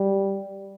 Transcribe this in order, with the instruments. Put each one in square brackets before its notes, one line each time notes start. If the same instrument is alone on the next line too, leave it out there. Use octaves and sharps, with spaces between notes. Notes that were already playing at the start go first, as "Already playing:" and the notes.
Already playing: [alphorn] G3